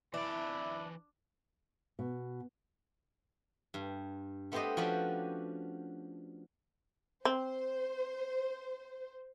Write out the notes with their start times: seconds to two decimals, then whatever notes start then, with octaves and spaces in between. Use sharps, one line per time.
0.14 E3 D4 E4 D5
1.99 B2
3.74 G2
4.52 A3 B3 C4 G4 C5 D#5
4.77 F3 C#4 D4 F#4 G4 B4
7.25 C4 C5